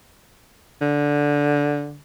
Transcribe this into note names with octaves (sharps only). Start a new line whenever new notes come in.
D3